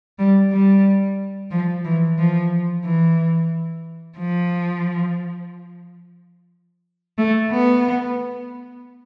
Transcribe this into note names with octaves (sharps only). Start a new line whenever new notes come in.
G3
G3
F3
E3
F3
E3
F3
A3
B3